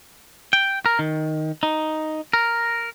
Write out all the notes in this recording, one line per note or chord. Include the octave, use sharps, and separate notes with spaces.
G5
A#4
D#3
D#4
A#4